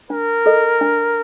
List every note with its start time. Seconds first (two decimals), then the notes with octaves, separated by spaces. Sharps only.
0.10 D4 A#4
0.46 A4 D#5
0.81 D4